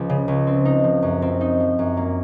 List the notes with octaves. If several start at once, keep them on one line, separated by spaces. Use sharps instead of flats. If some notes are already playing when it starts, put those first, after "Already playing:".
Already playing: C#2 F3
C#3
C#2
C4
D#4
F3
F#2
C4
D#4
F3
F#2
A#3